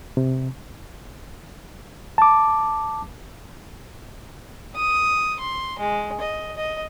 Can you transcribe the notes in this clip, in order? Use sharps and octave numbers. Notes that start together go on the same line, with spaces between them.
C3
A5 D6
D#6
C6
G#3
D#5
D#5